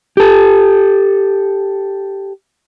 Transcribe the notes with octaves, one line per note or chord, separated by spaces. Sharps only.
G4 A4